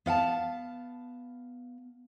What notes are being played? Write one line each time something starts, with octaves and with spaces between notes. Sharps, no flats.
B3 F5 F#5 A5